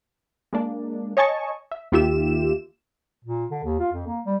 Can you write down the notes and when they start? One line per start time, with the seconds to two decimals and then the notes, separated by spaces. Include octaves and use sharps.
0.53 G#3 A#3 D4
1.17 C#5 D#5 G#5 A5 C#6
1.71 E5
1.92 D#2 D#3 F4 G4 E5 E7
3.24 A#2
3.51 D3
3.64 D#2
3.79 F4
3.93 F2
4.07 A#3
4.25 G3